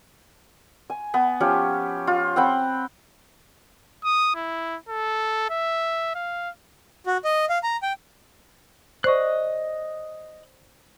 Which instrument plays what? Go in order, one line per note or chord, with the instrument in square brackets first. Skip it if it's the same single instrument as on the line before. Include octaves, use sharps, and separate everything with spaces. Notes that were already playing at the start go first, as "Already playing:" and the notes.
[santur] G#5
B3
F3 C#4 G4 C#5
F4
C4 F#5 G5 B5
[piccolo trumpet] D#6
E4
A4
E5
F5
[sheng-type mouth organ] F#4
D#5
F5
A#5
G5
[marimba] C5 D5 C#6 [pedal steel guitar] D#5 F#6